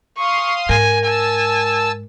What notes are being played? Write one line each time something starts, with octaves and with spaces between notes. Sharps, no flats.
F5 C6 C#6 D#6
G#2 A#4 G#5
G#5 A5 E6